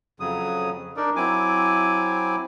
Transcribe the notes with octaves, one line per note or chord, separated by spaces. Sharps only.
F2 C#3 F#3 D#6
D4 D#4 A#4 D5
F#3 C4 E4 G#5 D6